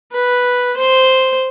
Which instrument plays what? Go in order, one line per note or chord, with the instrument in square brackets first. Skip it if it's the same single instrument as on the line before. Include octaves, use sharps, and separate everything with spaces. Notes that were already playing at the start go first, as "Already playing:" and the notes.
[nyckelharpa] B4
C5